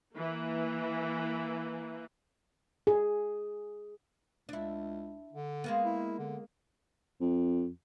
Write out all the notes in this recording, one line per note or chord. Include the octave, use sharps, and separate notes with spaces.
E3 A#3
G#4
C#2 D4 E4
D3
G#3 A#3 B3
E4
D3
F2